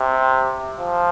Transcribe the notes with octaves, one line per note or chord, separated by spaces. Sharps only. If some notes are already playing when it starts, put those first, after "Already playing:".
Already playing: C3
F3